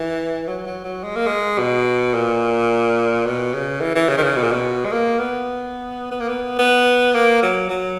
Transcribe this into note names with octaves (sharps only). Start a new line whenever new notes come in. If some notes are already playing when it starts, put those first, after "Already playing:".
Already playing: E3
F#3
F#3
F#3
G#3
A#3
G#3
B2
A#2
B2
C#3
E3
E3
C#3
D#3
C#3
B2
A#2
B2
G#3
A#3
B3
B3
A#3
B3
B3
A#3
F#3
F#3